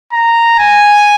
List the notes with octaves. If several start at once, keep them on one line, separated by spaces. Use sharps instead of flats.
A#5
G#5